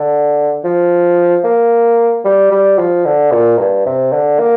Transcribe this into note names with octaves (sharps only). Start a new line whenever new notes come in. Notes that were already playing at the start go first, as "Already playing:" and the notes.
Already playing: D3
F3
A#3
G3
G3
F3
D3
A#2
G2
C3
D3
A#3